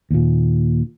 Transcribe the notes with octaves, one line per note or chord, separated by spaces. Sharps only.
D#2 A#2